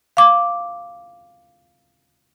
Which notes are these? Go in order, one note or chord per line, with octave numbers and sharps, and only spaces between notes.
F5 D6